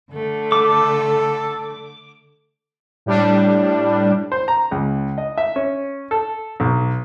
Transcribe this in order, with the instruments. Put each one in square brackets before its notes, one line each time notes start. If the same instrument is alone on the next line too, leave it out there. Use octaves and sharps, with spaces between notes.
[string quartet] D3 A3
[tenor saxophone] A4 [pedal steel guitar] D6
[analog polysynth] A2 G3 D4
[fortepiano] C5
A#5
C#2
D#5
E5
C#4
A4
B1